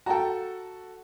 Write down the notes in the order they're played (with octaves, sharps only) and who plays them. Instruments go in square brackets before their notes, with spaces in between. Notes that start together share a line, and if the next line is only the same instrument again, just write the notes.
[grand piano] F#4 A4 [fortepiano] G5 A5 A#5